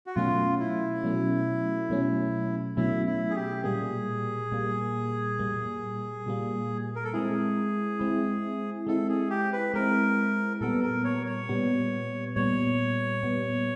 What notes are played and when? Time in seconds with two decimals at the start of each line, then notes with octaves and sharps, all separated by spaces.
0.07 F#4
0.15 B2 F#3 A3 C#4 F4
0.59 E4
1.03 B2 F#3 A3 C#4
1.90 B2 F#3 A3 C#4
2.77 B2 F#3 A3 C#4 E4
3.06 E4
3.30 G#4
3.35 G4
3.64 A#2 G3 A#3 G#4
4.52 A#2 G3 A#3
5.39 A#2 G3 A#3
6.26 A#2 G3 A#3
6.96 A#4
7.04 A4
7.13 G#3 C4 E4 G#4
7.99 G#3 C4 E4
8.87 G#3 C4 E4 A4
9.09 G#4
9.30 G4
9.53 B4
9.74 G#3 C4 E4 A#4
10.61 A#2 G3 B3 A4
10.83 A#4
11.04 C#5
11.26 C#5
11.49 A#2 G3 B3
12.36 A#2 G3 B3 C#5
13.23 A#2 G3 B3